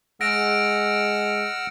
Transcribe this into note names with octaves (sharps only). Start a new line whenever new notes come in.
G#3 F#5 E6 F6 A#6 D7